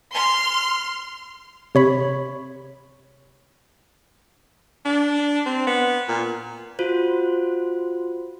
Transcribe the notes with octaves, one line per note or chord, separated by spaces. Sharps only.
C6 F6
C3 C#5 B5
D4
C4
B3
A#2
F4 F#4 C5